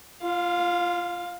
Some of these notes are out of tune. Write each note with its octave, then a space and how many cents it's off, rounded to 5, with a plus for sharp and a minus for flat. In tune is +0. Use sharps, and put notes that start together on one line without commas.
F4 -15 F5 +15